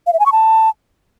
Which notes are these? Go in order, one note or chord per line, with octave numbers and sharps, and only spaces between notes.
F5
E5
G#5
C#6
A5